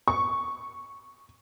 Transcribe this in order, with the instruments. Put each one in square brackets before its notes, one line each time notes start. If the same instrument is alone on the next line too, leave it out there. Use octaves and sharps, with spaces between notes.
[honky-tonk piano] C#6